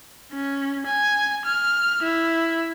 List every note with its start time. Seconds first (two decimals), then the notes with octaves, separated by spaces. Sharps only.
0.33 C#4
0.86 G#5
1.46 F6
2.03 E4